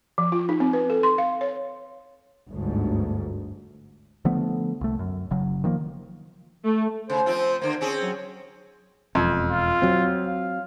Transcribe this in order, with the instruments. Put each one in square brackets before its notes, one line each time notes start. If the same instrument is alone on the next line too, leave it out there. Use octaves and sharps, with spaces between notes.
[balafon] F3
F4
D#4
C4
B4
A4
C6
F5
C#5
[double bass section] G1 D2 G#2
[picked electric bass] D3 F3 A3 B3
C2 A3
F#2
F#1 C#3 F#3
D#3 F3 A#3
[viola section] A3
[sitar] C#3 [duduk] C5
[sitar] F3 C4 F4
D3 A#3
C4 C#4 G#4
[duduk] F#3
[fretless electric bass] E1 [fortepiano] F2
[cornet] F4
[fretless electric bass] F#3 C4
[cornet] F5